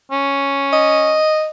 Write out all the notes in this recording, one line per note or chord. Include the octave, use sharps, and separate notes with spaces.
C#4
D#5